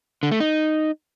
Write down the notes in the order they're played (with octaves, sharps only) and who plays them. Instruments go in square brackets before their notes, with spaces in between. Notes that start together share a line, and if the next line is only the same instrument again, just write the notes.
[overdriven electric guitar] D3
A3
D#4